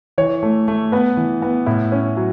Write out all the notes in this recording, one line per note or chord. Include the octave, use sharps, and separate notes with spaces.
E3 C#5
A3
A3
B3 B4
E3
B3
A2 E4
C#4
F#3